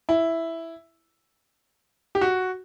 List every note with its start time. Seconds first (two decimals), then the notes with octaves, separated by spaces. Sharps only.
0.09 E4
2.15 G4
2.21 F#4